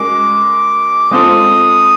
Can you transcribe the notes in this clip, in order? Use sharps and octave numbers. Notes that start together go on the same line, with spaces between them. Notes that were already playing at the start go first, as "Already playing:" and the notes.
Already playing: G#3 C#4 F#4 A#4 D6
G#3 C4 F4 A4 D#6